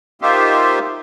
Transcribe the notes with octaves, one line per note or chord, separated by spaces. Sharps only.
A#3 D#4 F4 G4 C5 E5